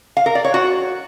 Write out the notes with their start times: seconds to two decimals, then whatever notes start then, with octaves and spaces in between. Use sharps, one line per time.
0.17 F5
0.26 A#4
0.35 D5
0.45 C#5
0.54 F#4